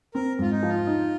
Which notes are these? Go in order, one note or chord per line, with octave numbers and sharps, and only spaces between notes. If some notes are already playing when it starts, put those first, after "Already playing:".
C4 A#4
G#2 F4
D#4
F3
F4
D#4